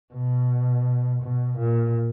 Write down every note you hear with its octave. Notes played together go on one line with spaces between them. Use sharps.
B2
B2
A#2